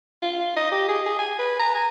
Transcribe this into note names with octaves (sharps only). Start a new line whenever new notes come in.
F4
D#5
G4
G#4
G#4
G#5
B4
A#5
G#5